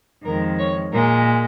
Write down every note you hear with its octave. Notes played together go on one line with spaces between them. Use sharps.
F2 D#3 G#3 A#4
C#5
A#2 G#3 A#4